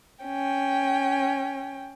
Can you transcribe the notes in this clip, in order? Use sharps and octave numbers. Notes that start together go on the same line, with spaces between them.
C#4 G5